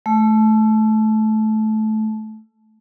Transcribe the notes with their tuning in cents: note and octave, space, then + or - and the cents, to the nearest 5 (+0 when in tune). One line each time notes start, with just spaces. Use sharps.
A3 -20